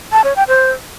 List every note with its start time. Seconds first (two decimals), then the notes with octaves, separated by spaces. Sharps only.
0.12 A5
0.24 C#5
0.36 G5
0.48 C5